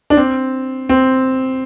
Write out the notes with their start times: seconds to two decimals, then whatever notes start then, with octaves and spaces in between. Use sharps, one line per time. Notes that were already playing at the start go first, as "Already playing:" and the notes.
0.10 D4
0.17 C4
0.89 C4